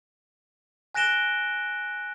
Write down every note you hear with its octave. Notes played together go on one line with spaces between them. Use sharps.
G#5 F#6 A#6 D7 E7 G7